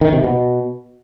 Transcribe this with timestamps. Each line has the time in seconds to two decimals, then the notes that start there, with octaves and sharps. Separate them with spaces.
0.01 D#3
0.13 C3
0.24 B2